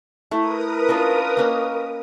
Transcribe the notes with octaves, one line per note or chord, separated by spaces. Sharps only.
A3 E4 A#4 B4 D#6
C#4 D4 F4
A#3 C#4 D#5